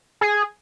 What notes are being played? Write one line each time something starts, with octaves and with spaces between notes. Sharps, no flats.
G#4